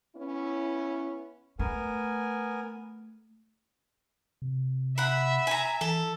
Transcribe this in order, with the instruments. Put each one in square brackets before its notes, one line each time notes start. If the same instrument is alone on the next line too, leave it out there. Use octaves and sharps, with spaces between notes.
[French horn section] B3 C#4 E4
[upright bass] A3 [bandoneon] B3 A#4 G#5
[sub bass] C3
[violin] E5 [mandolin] F#5 B5
[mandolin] G#5 A#5
[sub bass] E3 [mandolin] A4